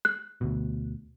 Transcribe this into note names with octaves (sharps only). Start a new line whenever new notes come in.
F#6
D2 B2